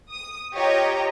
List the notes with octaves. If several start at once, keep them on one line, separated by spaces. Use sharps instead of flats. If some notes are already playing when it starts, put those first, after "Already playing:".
D#6
F4 G4 C#5 D#5 A#5